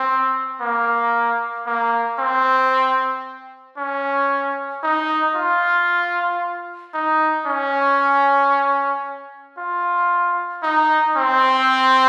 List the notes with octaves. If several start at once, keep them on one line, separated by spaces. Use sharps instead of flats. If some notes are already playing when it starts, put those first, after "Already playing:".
Already playing: C4
A#3
A#3
C4
C#4
D#4
F4
D#4
C#4
F4
D#4
C4